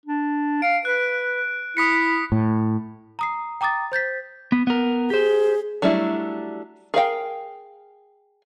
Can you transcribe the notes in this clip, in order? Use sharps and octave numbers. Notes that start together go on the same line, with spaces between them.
D4
F5 D7
B4 F#6
E4 D#6 B6 C#7
A2
A#5 D#6 C7
G5 A#5 D6 D#6 A6
C5 G6 A6 B6
B3
B3 A#4
G4 G#4 C5
F#3 G3 A3 D4 E4
G#4 A#4 F5 G5